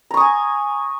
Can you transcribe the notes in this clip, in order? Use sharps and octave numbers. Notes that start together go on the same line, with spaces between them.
G#5 A#5 C#6 D#6